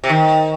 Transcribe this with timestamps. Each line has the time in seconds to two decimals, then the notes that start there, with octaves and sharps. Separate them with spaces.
0.04 C3
0.09 D#3